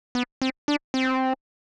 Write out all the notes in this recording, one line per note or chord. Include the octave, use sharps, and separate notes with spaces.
B3
C4
D4
C4